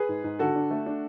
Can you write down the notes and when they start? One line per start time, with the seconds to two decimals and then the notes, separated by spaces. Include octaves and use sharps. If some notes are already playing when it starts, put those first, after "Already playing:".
Already playing: G#4 B4
0.09 G#2
0.24 G#2
0.39 D3 F#4 A4
0.55 D4
0.71 A3
0.86 D4